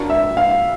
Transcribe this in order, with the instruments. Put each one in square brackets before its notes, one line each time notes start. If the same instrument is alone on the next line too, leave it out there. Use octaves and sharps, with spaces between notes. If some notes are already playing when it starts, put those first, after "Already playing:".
Already playing: [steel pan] D4 F#4 A#4
[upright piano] E5
F5